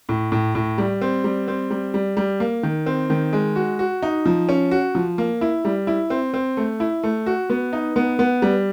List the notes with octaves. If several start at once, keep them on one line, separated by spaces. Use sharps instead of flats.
A2
A2
A2
G3
C4
G3
C4
G3
G3
G3
A#3
D#3
C4
D#3
G#3
F#4
F#4
D#4
F3
C#4
F#4
F3
A#3
E4
G3
E4
C4
C4
A3
E4
A3
F#4
B3
D#4
B3
B3
G3